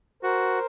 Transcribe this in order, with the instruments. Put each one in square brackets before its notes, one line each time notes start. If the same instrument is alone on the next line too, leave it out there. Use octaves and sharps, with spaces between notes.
[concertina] F#4 [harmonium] A#4 C5